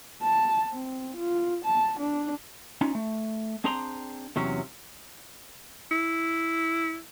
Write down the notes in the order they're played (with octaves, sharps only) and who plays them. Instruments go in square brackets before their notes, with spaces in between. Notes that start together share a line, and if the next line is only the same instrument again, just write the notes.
[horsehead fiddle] A5
C4
F4
A5
D4
[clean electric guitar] C#4 D#4 F4
A3
C4 D4 G#4 C5 A#5 C6
E2 C3 F#3 C#4
[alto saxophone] E4